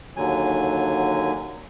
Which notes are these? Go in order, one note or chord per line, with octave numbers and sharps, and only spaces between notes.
D#2 D3 F#3 G#5